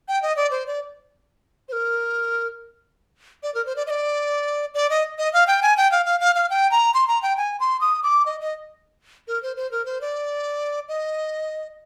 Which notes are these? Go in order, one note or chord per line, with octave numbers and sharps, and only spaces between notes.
G5
D#5
D5
C5
D5
C5
A#4
D5
A#4
C5
D5
D#5
D5
D5
D#5
D#5
F5
G5
G#5
G5
F5
F5
F5
F5
G5
A#5
C6
A#5
G5
G#5
C6
D#6
D6
D#5
D#5
A#4
C5
C5
A#4
C5
D5
D#5